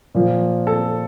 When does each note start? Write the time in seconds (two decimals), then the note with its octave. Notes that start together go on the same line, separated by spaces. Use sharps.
0.15 A#2 F3
0.67 A4